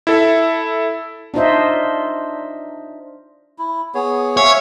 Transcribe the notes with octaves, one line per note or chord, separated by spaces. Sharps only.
E4 A4 E5
D4 D#4 F4 C5 D#5 E5
E4
B3 G#4 C#5
C#5 E5 F5 G#5